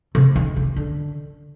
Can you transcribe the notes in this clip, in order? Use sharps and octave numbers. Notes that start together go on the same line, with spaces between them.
C3
D#3
D#3
D3